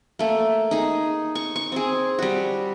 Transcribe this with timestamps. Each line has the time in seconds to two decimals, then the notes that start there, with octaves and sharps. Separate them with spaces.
0.19 A3 A#3
0.71 D#4 G#4
1.35 C#6
1.56 C#6
1.72 C4 G#4
2.19 G3 F#4